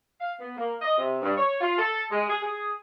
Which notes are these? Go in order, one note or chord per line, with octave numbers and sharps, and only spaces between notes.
F5
B3
A#3
D#5
C3
G2
C#5
F4
A4
G#3
G#4
G#4